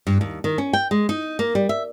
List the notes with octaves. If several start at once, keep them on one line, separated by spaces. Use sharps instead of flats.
G2
D#2
D#3
C#4
G5
G#3
D#4
A#3
G3
E5